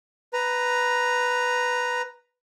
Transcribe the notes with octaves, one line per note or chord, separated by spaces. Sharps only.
B4 A#5